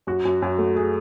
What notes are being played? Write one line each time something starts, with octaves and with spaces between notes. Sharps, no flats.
F#2 F#4
F#2
F#2
A3
G#4